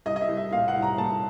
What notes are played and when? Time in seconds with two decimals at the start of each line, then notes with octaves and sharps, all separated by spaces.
0.06 C2 D#5
0.16 D#5
0.21 E5
0.28 C2
0.37 E5
0.51 A#2 F5
0.68 F#5
0.75 C2
0.82 A#5
0.98 A#2 A5